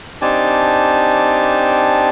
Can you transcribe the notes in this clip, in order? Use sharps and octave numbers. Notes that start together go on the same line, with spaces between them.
C4 D4 D#4 G4 G#5 A5